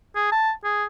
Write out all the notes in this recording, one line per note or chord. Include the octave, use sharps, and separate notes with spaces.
G#4
A5
G#4